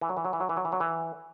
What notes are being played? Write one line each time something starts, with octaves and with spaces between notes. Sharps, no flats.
E3
F#3
E3
F#3
E3
F#3
E3
F#3
E3
F#3
E3